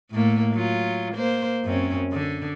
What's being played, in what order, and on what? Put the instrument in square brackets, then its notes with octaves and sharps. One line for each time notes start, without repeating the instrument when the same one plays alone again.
[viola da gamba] A2 A3 A#3
F#3 F4
A#3 C5
F#2 C4 C#4
D3